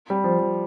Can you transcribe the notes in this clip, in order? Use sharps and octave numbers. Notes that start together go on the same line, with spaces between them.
G3
F3
F3